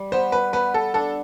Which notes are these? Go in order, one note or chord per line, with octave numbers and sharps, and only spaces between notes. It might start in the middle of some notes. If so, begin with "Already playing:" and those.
Already playing: G3
B3 C5
B4
B3 B4
A4
D4 A4